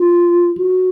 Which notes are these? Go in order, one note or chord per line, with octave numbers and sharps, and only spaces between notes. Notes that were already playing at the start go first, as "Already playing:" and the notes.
Already playing: F4
F#4